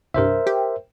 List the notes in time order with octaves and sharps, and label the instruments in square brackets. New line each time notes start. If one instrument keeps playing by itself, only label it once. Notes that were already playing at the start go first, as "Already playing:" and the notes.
[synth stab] C2 G2 [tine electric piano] A#4 C5 E5
[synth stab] G4